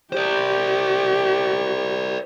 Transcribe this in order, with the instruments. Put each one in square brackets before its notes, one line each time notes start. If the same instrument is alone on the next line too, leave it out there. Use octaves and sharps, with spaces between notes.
[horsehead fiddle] G4 [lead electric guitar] C5 D5